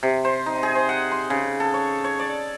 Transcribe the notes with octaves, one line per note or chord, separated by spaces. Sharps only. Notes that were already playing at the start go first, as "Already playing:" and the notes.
C3
C5
D#4
G#4
C5
F#5
C6
C#3
A4
C#5
C#5
D5